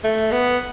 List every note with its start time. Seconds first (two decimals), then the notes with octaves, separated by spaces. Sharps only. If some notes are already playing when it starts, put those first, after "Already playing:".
0.04 A3
0.32 B3